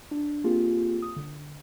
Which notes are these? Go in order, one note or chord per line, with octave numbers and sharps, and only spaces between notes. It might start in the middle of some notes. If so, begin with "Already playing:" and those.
D4
A#3 C4 F4 G4 G#4
D#6
D3